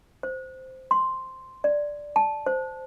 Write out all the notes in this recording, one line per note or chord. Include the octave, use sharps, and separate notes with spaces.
C5
C6
D5
A5
C5